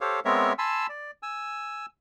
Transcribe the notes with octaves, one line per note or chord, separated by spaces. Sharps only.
G4 A4 C5 C#5 F5
G#3 B3 C4 A#4 C#5 E5
G#5 A5 B5 C6 E6
D5
G#5 E6